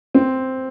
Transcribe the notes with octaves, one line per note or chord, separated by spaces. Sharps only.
C4